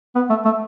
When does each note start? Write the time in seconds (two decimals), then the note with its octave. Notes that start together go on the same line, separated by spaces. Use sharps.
0.15 B3
0.30 A3
0.45 A3